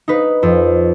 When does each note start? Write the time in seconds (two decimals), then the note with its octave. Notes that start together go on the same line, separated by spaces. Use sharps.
0.08 D#4 B4
0.43 F2